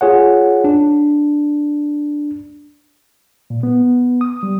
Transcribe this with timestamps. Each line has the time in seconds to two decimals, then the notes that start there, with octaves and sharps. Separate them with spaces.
0.01 F4 G#4 C#5 F#5
0.64 D4
3.50 A#2
3.63 B3
4.21 D#6
4.43 G3